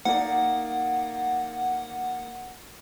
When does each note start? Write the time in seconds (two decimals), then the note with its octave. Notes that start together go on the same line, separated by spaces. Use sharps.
0.05 A#3 D#4 D5 F#5